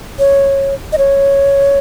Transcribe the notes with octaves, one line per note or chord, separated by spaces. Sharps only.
C#5
D#5
C#5